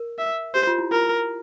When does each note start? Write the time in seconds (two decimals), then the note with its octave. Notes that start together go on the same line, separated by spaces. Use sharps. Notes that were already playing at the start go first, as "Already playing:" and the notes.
Already playing: A#4
0.19 E5
0.55 G4 C5
0.67 F4
0.78 E4
0.91 F4 A#4